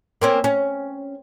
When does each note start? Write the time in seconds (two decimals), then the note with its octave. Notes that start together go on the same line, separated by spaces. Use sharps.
0.21 A#3 C4 C#4
0.44 C#4